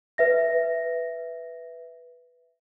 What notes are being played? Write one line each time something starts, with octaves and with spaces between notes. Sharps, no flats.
B4 E5 A#6